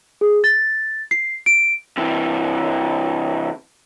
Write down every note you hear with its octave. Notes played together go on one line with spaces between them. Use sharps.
G#4
A6
C7
D7
C3 E3